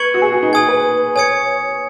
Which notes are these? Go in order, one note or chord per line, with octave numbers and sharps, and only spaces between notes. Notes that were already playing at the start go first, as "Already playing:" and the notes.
Already playing: B4 C#6 G#6 C#7 F#7
F#4
G#4
F#4
D#4
G#4 G#5 D#6 G#6
B4
C#5 G#5 D#6 G#6 C#7